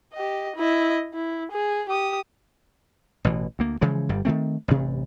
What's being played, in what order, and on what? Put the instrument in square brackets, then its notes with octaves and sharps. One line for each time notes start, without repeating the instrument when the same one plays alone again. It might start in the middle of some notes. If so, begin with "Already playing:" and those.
[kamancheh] G4 D#5
E4 D#5
E4
G#4
G4 D#6
[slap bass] A1 B2 E3
D2 A#3
C#3 E3 F3 G#3
G1 G2 G3
D#3 E3 A3 C4
A1 G2 C3